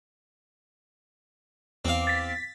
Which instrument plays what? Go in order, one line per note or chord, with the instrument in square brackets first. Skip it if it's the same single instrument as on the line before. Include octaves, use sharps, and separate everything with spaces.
[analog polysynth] E2 D6 [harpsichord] C4 F5
[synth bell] A6 B6